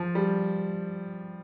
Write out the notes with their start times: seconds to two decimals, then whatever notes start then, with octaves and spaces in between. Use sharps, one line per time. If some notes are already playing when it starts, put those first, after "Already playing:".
Already playing: F3
0.15 G3